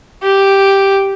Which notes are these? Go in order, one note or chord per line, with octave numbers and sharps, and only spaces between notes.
G4